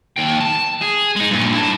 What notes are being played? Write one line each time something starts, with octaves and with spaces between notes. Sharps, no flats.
D#2 G5
A5
G#4
G#3 D#4
G2 A#2
E4 A5